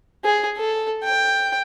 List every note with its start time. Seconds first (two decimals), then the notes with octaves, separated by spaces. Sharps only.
0.24 G#4
0.58 A4
1.04 G5